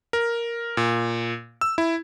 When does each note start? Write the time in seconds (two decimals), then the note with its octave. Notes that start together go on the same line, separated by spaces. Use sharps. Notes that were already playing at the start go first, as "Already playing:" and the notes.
0.13 A#4
0.77 A#2
1.61 E6
1.78 E4